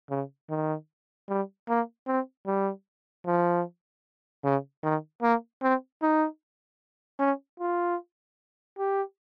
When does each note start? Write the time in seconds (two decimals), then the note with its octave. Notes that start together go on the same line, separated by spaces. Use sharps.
0.10 C#3
0.50 D#3
1.29 G3
1.69 A#3
2.07 C4
2.46 G3
3.26 F3
4.44 C#3
4.83 D#3
5.22 A#3
5.62 C4
6.02 D#4
7.19 C#4
7.60 F4
8.78 G4